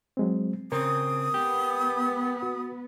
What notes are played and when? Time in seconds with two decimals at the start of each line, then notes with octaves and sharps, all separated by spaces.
0.17 F#3 G#3 C4
0.72 C#3 C4 A#4 D#6
1.34 B3 G4
2.42 F#4